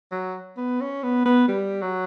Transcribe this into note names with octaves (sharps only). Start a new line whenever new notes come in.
F#3
B3
C#4
B3
B3
G3
F#3